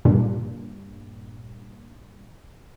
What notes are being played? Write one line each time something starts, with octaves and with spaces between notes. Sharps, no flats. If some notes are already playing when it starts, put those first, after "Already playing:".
G2 A#2